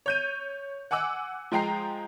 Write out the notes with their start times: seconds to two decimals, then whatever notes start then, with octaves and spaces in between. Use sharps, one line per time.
0.06 C#5 G6 D#7
0.91 F#5 G#5 D6 E6 F#6
1.52 F3 G#3 G5 A#5 C7